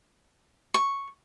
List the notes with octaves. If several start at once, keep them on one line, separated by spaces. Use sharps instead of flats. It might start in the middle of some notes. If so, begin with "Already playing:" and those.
C#6